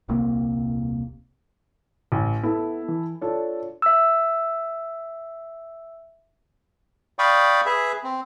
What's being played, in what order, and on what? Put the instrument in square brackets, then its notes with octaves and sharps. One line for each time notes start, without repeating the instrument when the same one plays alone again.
[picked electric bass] D#1 C2 C3 A#3
[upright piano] A1
[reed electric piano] B3 [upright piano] E4 A4
[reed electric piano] E3
[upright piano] D4 A4 [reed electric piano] F4 C#5
[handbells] E5 E6
[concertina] D5 F5 G5 B5 C#6 D#6
G#4 B4 E5
C4